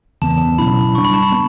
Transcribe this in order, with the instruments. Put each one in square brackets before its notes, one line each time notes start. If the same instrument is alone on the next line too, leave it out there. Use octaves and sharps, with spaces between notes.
[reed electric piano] E2 C#3 E3 B3 [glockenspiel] A5
[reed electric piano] B2 F#3 C#4 E4 [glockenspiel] B5
[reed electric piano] C#3 G3 D4 [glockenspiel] C#6
[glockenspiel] B5
A5
B5
[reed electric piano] B3